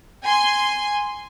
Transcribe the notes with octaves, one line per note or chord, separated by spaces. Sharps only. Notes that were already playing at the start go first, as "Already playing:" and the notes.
G#5 C6